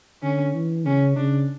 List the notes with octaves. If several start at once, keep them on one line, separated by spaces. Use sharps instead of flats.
D3 C#4
E3
C#3 C#4
C#3 D4